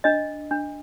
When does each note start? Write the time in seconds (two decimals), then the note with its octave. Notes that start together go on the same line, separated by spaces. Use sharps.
0.04 D4 D#5
0.51 D4